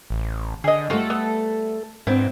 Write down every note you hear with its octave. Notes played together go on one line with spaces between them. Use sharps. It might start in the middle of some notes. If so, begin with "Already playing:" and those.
A1
D3 G#4 D#5
G3 A3 F4 F#4 A4
B3
G#2 B3 C4 D4 E4